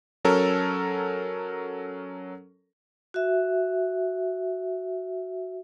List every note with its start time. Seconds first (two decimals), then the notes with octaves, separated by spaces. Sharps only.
0.25 F#3 C#4 A4 A#4
3.14 F#4 E5